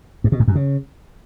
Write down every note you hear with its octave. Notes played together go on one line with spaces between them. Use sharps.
G2
B2
G#2
F#2
C#3